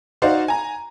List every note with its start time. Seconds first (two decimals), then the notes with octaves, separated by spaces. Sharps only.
0.22 D#4 F#4 C5 D5 F5
0.48 G#5 A#5